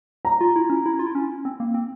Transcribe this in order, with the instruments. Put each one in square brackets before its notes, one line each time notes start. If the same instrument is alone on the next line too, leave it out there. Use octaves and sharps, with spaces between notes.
[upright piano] A#5
[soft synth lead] F4
E4
C#4
E4
F4
E4
C#4
C4
A#3
C4